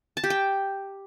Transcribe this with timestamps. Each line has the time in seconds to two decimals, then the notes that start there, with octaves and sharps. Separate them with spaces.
0.17 A5
0.24 G4
0.30 G5